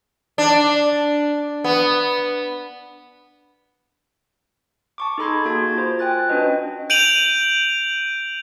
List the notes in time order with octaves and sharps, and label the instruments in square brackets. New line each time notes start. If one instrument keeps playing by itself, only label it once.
[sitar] D4
B3
[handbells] A5 C#6 D6
D#4 G#4 A4 B5 C6 G#6
A#3 F#4 G#4 A5 C6 G#6
F4 C5
G5 G#5 F#6 A6
C#4 D4 F#4 B4 D#5
[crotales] G6 D7 D#7 F7 F#7